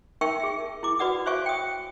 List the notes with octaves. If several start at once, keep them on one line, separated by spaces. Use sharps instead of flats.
D#4 A#4 E5 G5 C#6
G#4 E5
E4 D6
F#4 B4 D5 F#5 D#6
C5 C#5 E5 F5 G#5 C#6
G5 D#6